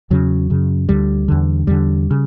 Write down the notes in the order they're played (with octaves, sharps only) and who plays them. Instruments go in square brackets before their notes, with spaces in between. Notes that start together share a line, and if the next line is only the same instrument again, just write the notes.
[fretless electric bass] E2 C#3 F#3
F#2 C#3
D2 D3 G3
E2 D3
E2 D3 G3
C#3